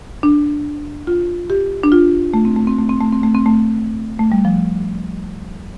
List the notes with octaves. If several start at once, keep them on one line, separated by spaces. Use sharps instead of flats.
D4
F4
G4
D4
F4
A3
C4
A3
C4
A3
C4
A3
C4
A3
C4
A3
A3
G3
F3